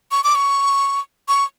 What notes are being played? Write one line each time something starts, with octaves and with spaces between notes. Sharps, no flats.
C#6
D6
C#6
C#6